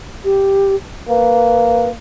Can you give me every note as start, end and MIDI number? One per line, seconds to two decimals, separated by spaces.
0.24 0.75 67
1.09 1.93 58
1.09 1.89 71